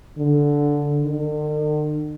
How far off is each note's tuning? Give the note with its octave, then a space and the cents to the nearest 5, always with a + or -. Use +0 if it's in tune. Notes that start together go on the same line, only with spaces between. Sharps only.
D3 -10
D3 +45